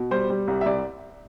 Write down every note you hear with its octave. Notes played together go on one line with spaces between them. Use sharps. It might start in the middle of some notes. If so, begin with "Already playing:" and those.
Already playing: B2
G3 C5
G3
C2
E5
C2 D5